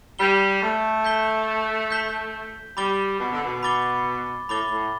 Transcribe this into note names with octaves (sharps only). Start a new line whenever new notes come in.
G3 G6 B6 G7
A3
G6 B6 G7
G6 B6 G7
G3 B5 D6 A6 G7
B2
D3
B2
B5 D6 A6 G7
A2 B5 D6 A6 G7
A2